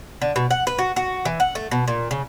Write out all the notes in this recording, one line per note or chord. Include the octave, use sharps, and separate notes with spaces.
D3
B2
F#5
B4
F#4
F#4
E3
F#5
A3
B2
A#2
C#3